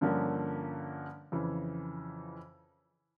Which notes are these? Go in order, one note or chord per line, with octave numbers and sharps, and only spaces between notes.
G2 D3 F3 A#3 C#4
F2 C#3 E3